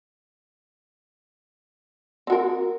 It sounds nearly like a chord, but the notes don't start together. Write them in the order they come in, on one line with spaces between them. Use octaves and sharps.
C4 F#4 A#4